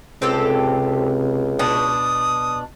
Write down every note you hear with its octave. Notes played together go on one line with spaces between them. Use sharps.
C#2 C3 C4 G4 A4
B2 D4 D#6